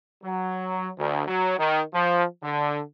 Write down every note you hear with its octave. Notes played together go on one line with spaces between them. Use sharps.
F#3
D2
F#3
D#3
F3
D3